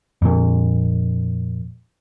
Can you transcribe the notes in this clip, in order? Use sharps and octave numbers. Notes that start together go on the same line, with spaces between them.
F2 A#2